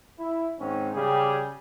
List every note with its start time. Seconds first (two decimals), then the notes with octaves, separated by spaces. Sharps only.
0.18 E4
0.60 G#2 D#3 C4 C#4
0.95 C#3 G3 G4 G#4